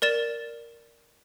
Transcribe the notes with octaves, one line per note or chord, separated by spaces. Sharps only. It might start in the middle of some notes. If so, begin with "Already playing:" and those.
A#4 D5 A6 E7